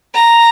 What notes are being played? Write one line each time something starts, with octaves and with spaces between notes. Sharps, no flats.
A#5